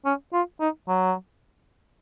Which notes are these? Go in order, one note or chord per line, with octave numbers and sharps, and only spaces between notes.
C#4
F4
D#4
F#3